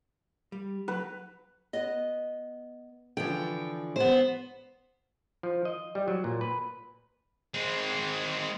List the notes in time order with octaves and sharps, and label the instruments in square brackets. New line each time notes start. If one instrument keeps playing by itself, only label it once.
[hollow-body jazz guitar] G3
[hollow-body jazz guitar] F#3 [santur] B4
[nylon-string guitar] B3 D#5
[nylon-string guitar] D3 E3 F3 [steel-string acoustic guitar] G5
[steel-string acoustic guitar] B3 C5
[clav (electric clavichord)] F3
D#5
G3
F#3
A#2
B4
[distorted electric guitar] G#3 C4